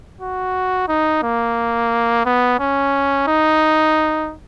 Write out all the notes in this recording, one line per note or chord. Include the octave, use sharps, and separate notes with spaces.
F#4
D#4
A#3
B3
C#4
D#4